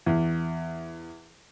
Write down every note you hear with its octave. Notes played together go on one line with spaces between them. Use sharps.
E2